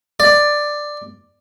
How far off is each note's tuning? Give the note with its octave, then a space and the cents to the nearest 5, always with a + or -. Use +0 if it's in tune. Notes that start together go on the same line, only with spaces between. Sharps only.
D5 +10